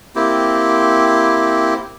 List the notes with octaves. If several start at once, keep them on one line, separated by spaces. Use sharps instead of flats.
A#3 C4 E4 G4